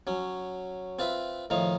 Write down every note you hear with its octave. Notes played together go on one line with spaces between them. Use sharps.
F#3 C#4
C4 F4 B4 E5
A2 D#3 F3 D#4 F5